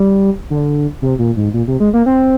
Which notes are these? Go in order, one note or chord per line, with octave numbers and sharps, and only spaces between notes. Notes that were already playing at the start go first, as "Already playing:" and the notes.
Already playing: G3
D3
C3
A#2
G#2
A#2
C3
G#3
A#3
C4